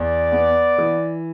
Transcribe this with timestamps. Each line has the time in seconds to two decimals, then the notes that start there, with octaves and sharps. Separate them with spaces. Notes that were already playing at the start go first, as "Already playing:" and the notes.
Already playing: E2 D5
0.32 B3
0.78 E3